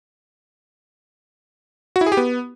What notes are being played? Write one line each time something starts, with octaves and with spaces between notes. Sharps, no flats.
F#4
E4
G#4
G4
B3